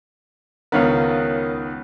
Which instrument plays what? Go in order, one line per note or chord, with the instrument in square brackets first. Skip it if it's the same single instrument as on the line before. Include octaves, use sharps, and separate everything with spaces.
[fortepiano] C#2 D#3 B3 [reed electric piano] A#4 C#5 F5